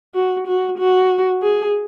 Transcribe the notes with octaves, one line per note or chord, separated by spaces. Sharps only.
F#4
F#4
F#4
G#4